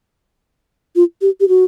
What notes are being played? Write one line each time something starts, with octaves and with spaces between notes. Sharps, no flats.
F4
G4
G4
F#4